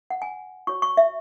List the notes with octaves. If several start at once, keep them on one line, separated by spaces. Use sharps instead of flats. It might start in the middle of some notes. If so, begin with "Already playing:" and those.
F#5
G#5
F#4 C#5 C#6
C#6
E5